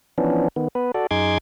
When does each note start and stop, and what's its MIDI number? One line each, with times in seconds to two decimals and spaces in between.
0.18 0.48 52
0.18 0.48 53
0.18 0.48 59
0.18 0.48 61
0.18 0.48 62
0.56 0.68 51
0.56 0.68 59
0.75 0.92 59
0.75 0.92 71
0.94 1.07 66
0.94 1.07 69
0.94 1.07 74
1.11 1.38 42
1.11 1.38 63
1.11 1.38 68
1.11 1.38 84
1.11 1.38 86
1.11 1.38 92